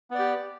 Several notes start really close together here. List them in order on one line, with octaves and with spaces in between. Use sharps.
B3 D5 G4